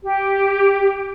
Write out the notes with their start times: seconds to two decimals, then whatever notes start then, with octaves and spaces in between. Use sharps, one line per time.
0.03 G4